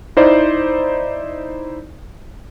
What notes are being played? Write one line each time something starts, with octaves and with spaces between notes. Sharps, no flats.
D#4 E4 C5 D5